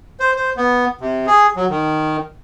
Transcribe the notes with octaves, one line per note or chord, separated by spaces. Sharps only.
C5
C5
B3
C3
G#4
F#3
D#3